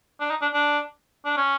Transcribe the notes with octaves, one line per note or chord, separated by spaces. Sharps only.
D4
D#4
D4
D4
D4
C#4